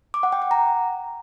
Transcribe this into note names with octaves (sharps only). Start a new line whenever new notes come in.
D6
F#5
G5
F#5
A#5